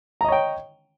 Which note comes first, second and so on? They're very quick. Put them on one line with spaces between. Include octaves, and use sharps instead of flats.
A#5 D#5 C#5 G5